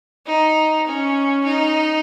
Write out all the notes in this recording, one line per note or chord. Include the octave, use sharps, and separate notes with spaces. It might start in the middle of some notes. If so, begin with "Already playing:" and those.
D#4
C#4
D#4